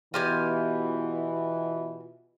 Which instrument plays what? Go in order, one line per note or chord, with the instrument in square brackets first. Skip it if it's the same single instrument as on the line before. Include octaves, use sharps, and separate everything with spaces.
[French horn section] B2 E3 [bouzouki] F4 G4 G#5